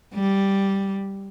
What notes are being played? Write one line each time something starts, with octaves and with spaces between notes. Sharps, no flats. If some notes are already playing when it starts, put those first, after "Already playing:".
G3